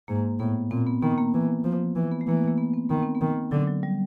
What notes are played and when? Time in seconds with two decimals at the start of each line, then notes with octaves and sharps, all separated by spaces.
0.08 G#2 A#3
0.39 A2 B3
0.71 A#2 C4
0.87 B3
1.02 D#3 B3
1.18 A#3
1.34 E3
1.64 F3
1.96 E3
2.12 B3
2.21 A3
2.27 E3 A#3
2.37 B3
2.48 A#3
2.58 B3
2.74 C4
2.89 D#3 B3
3.02 C4
3.15 B3
3.21 D#3
3.51 D3 F#3
3.67 F#3
3.83 G3